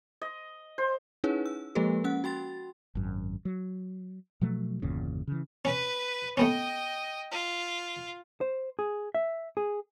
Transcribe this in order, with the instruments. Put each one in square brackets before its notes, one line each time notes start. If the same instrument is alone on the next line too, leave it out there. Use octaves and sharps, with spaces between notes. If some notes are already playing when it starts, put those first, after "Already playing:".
[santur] D#5
C5
[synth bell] C#4 D#4 E4 G#4 B4 C#5
E6
F3 G#3 A#3 G4 A4 B4
C#4 F#5 F#6
F#4 G5 C6 A6
[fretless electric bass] G#1 F#2
F#3
B2 F3 F#3 A3
G1 E2 A#2 C#3
C#3 E3
[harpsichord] C#4 [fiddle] B4
[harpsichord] A3 B3 C#4 [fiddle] D#5 G5
[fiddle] F4
[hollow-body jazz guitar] C5
G#4
E5
G#4